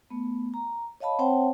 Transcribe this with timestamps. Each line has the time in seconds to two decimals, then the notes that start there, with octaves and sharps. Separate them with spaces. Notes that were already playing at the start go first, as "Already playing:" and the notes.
0.10 A3 B3
0.54 A#5
1.00 C#5 D#5 F5 A5 B5
1.19 C4 C5 C#5 F#5 G5 A5